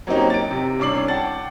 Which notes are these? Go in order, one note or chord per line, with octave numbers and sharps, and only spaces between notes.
F#3 A#3 C4 C#4 D#4 G4
A6 D7
C3
C2 C#4 D4 D6 C7 F#7
F#5 G5 A5 A6